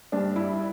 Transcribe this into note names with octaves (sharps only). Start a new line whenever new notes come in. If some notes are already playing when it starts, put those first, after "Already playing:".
G2 D4
E4